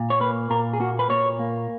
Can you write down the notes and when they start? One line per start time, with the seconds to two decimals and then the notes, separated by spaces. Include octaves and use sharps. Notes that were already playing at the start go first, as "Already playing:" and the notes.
Already playing: A#2
0.10 C#5
0.20 A#3 B4
0.50 A#2 A#4
0.73 G#4
0.80 A#3 F#4
0.99 B4
1.10 A#2 C#5
1.39 A#3